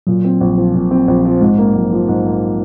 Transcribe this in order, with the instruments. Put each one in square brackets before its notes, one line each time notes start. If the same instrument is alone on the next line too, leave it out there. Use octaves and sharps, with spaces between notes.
[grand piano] A#2 [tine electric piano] F#3
[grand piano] C4
A#1
F3
A#2
C4
A#1
F3
[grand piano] G#2 [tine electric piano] G#3
[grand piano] A#3
[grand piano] A#1 [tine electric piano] F#3
[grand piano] F3
G#2
A#3